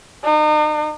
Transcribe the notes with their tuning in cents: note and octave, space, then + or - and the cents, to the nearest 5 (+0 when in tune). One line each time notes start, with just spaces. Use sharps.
D#4 -40